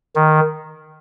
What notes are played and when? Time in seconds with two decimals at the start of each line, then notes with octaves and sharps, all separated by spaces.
0.15 D#3